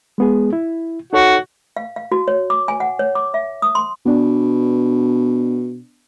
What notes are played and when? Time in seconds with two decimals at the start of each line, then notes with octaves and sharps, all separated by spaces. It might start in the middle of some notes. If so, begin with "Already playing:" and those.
0.18 G#3 B3 G#4
0.53 E4
1.13 D#4 F#4 A4 C#5
1.77 F5
1.96 F5
2.12 F#4
2.28 C#5
2.50 D6
2.68 G#5
2.80 F#5
2.99 C#5
3.15 D6
3.34 E5
3.62 D#6
3.75 C6
4.06 B2 B3 D4